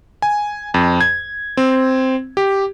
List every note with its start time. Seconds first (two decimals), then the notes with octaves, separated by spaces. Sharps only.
0.22 G#5
0.74 F2
1.01 G#6
1.57 C4
2.37 G4